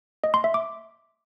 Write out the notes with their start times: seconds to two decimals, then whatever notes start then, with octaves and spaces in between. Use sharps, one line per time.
0.24 D#5
0.34 C6
0.44 E5
0.54 D6